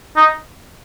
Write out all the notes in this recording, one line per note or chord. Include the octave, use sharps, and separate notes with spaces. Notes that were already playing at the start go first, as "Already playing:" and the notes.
D#4